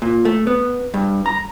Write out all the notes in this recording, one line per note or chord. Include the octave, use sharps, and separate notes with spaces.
A#2
A3
B3
G2
A#5